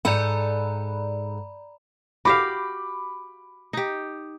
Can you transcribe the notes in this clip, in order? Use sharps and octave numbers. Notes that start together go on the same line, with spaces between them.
G#2 A4 D5 F#5 A#5 B5
F#4 G4 F5 B5 D6
D#4 G4